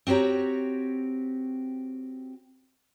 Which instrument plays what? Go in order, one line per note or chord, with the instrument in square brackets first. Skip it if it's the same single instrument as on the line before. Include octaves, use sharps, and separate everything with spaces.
[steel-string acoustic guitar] C4 F#4 G4 C#5 A#5